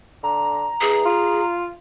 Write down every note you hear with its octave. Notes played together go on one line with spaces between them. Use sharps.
D3 A#5
E2 G#4
F4